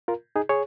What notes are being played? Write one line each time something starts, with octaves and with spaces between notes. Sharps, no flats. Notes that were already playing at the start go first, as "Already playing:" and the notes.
F4 A#4
D#4 G#4
G#4 C#5